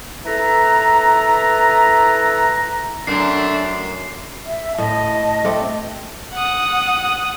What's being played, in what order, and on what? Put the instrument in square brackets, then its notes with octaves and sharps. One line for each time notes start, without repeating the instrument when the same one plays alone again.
[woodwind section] E4 A4 B4 A#5
[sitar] F#2 [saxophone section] A3 D4 [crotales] C7
[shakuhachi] E5
[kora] A2 [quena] D#5 [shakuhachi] A5
[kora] A3 C4 D5
[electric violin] F#5 D#6